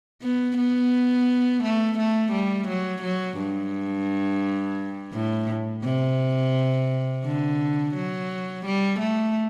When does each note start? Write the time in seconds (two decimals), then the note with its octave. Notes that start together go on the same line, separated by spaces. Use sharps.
0.22 B3
0.57 B3
1.63 A3
1.98 A3
2.32 G3
2.68 F#3
3.02 F#3
3.38 G2
5.13 A2
5.84 C3
7.25 D3
7.94 F#3
8.65 G3
8.99 A3